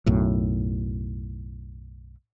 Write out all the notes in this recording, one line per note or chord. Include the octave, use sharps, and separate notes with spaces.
B1 F#2 A2